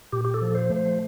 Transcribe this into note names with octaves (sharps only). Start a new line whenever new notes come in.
A#2 G4
G4
A4
F3
C5
A3
C5